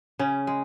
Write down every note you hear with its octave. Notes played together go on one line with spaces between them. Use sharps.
C#3 C#4
G#3